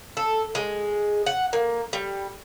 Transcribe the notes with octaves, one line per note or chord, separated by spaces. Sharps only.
A4
G#3
F#5
A#3
G3